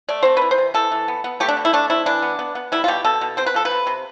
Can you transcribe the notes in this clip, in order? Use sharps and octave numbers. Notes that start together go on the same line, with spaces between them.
A3 D5
C4 C5
E3 B4
C5
C3
E3 A4
E3
B3
B3
A3 G4
D4
B2
E4
A3 D4
C4 E4
E3 D4
B3
B3
B3
G3 E4
F4
B2 G4
B2 A4
B2
C4 C5
B4
F3 A4
B4
C3
C3